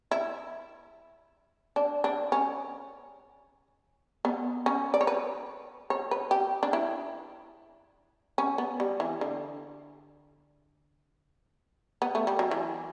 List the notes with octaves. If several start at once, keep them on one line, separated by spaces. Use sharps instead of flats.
E4
D4
D4
C#4
B3
C#4
D5
C#5
B4
C#5
B4
G4
D4
E4
C#4
B3
G3
E3
D3
B3
A3
G3
F#3
E3